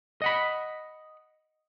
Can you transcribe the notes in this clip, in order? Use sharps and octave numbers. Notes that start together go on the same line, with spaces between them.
D#5 F#5 B5